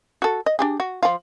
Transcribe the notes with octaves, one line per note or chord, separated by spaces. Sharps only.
F#4 A4
D#5
D4 G4 G#4
F#4
F3 F4